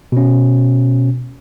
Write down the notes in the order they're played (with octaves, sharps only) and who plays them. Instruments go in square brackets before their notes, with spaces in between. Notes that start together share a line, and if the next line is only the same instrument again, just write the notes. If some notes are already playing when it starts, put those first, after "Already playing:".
[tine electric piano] B2 C#4